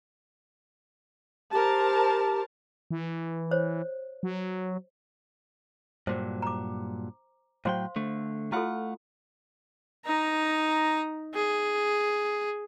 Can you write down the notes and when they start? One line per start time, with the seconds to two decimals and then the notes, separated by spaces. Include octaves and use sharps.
1.52 G4 A#4 C5 A5
2.91 E3
3.51 C5 C#5
4.23 F#3
6.07 G2 A#2 F#3 C5
6.42 A#5 D6
7.65 A2 F#3 C5 F5 G5 C6
7.96 D3 A3
8.52 A3 E4 F4 A4 F5 F#5
10.06 D#4 A#5
11.35 G#4